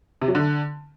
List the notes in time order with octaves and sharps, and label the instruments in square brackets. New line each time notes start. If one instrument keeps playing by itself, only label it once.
[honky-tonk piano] C3
F#3
D3